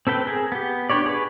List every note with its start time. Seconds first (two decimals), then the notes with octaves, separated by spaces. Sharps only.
0.07 C4 A4 B4 G5
0.25 G#4 A#4
0.52 B3 G4
0.90 D4 G4 B4 C#5 D5
1.06 G#4 B4